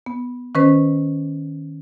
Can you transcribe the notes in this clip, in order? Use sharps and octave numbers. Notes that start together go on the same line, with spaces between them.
B3
D#3 C#4 B4 C5